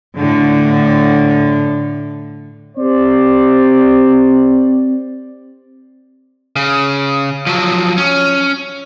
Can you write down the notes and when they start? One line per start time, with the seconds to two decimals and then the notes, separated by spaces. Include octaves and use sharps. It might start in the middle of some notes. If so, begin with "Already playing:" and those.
0.18 A2 D3
2.78 C4 G4 C5 D5
6.56 C#3
7.47 F3 F#3
7.98 C#4